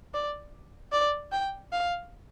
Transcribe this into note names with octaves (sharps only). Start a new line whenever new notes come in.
D5
D5
G5
F5